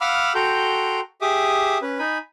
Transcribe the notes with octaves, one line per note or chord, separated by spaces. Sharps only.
F5 F#5 B5 D6 E6 F6
F#4 A4 G5 A#5 C6 G6
G4 G#4 E5 D6 D#6
C#4 B4
D#4 G#5 B5